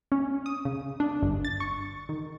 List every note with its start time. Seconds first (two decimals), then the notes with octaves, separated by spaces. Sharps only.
0.12 C#4
0.46 D#6
0.65 C#3
1.00 D4
1.22 G1
1.45 A6
1.60 C#6
2.09 D#3